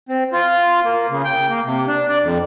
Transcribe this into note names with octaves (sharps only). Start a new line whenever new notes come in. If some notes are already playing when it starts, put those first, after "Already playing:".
C4
F4
A#3
C#3
G5
A#3
C3
D4
D5
F2